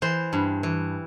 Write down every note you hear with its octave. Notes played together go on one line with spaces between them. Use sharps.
E3 C5
G2
E3